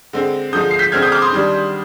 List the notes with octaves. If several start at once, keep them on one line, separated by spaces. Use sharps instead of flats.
D3 G#3 C4
D3 F3 G#3 D#6 G6
C7
G6 B6
D3 G#3 C4 F6 G#6
D#6 G6
D6 F6
C6 D#6
D#3 G3 D4